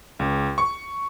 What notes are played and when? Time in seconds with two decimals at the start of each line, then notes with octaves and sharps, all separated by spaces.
0.19 C#2
0.58 C#6